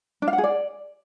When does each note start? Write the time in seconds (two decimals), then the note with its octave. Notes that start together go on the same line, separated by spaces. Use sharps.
0.22 D4
0.28 F5
0.33 F#5
0.38 G#4
0.44 D5